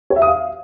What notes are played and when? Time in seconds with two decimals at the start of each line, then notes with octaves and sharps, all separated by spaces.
0.10 C#5
0.16 E5
0.22 D#6
0.27 F5